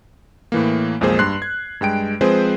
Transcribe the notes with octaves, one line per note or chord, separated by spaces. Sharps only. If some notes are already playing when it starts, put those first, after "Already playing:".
A2 E3 A#3
B1 F2 G#3 A#3 G#4 C5
G2 C6 F#6 C7
G#6
G2 G#3 G5 D7
F3 G#3 C4 G#4 B4 C5